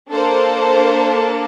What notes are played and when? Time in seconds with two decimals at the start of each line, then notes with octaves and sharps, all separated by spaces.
0.11 A#3 D4 A4 C5